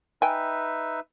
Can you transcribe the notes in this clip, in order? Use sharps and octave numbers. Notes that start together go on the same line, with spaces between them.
D#4 B4 E5 G5 G#5